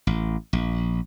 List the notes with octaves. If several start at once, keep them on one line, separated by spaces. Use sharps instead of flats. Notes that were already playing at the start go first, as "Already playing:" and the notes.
A1
A#1